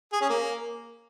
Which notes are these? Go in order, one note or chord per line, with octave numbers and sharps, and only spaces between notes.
G#4
C#4
A#3